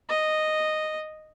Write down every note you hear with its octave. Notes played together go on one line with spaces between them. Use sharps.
D#5